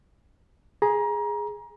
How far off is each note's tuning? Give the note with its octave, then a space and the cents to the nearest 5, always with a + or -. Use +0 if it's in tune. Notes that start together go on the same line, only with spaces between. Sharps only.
G#4 +0 A#5 +25